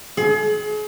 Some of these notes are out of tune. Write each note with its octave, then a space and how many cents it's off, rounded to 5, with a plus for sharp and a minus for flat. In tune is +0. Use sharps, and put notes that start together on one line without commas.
G#4 +35